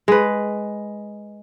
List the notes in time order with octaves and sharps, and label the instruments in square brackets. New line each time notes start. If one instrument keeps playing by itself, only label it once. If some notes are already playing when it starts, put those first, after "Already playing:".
[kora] G#3 B4